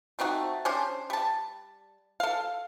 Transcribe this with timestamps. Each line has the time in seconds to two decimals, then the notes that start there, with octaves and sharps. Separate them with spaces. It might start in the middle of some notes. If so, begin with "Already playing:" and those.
0.19 A3 C4 D#4 F#4
0.65 C#4 D4 G4 C5
1.10 G3 A5
2.20 A4 F5